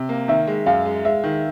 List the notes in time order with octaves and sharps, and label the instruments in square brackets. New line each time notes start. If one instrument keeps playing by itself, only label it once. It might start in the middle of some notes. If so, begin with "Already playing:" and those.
Already playing: [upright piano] C3
A#3
[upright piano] D#3 [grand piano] E5
[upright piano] G#3
[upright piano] F#2 [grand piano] F5
[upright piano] G#3
[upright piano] G#3 [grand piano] E5
[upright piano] D#3